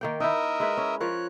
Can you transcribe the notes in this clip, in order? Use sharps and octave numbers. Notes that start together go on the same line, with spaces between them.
D#3 A#3 G5
D#4 E4 A#4 D#5 E5
G#3 E4 B4
C#4
F3 C#4 A#4 C#5 F#6